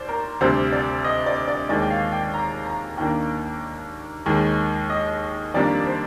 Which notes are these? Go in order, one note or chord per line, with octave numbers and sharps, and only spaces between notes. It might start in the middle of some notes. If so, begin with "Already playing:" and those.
Already playing: D#2 C5 D5
A#4
D2 C3 G3 D4 C5
D5
D#5
D5
D5
D#2 D#3 G#3 D5
G5
F5
G5
A#5
A#5
D#2 D#3 A#3 D4 G5
D#2 D#3 G#3
D#5
F2 D#3 G3 A#3 D4 D5
C5